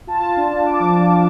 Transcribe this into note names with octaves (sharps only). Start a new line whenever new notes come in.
F4 A5
F4
D4
D4
D4 D6
F3
F4
D4